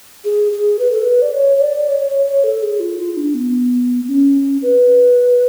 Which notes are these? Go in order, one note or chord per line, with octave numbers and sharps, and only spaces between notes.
G#4
G#4
B4
A4
B4
D5
C#5
C#5
D5
C#5
C#5
C#5
A4
G#4
F4
F4
D4
B3
C#4
B4